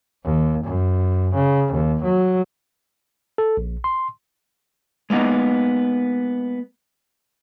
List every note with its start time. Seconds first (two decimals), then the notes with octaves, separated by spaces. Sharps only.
0.25 D#2
0.64 F#2
1.35 C#3
1.73 D#2
2.04 F#3
3.38 A4
3.57 A#1
3.84 C6
5.10 G#3 A#3 B3 D#4